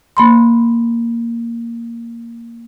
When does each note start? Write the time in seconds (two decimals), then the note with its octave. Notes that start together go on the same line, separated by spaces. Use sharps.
0.17 A#3 B5 C6